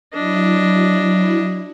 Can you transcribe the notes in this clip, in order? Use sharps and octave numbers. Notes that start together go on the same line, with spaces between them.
F#3 D4 E4 D#5